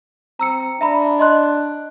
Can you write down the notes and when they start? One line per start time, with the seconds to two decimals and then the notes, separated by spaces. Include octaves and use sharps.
0.39 C4 A#5 E6 C#7
0.81 D4 E5 A#5 B5
1.19 D#5 C6 F#6